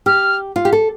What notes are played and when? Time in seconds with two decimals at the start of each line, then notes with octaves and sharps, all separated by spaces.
0.06 G4 F6
0.56 F4
0.65 G4
0.73 A4